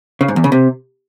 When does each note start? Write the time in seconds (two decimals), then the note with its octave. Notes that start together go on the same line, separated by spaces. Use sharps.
0.21 C#3
0.28 G#2
0.36 E2
0.44 C#3
0.52 C3